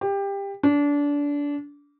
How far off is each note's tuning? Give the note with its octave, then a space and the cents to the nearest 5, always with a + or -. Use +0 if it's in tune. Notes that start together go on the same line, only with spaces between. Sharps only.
G4 +20
D4 -25